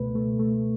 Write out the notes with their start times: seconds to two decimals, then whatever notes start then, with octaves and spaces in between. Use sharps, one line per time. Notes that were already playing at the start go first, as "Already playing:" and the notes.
Already playing: C#2 B2 A3 B4
0.15 A3
0.39 A3